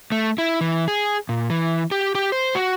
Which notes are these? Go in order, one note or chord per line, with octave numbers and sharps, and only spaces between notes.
A3
E4
E3
G#4
A#2
E3
G4
G4
C5
F#4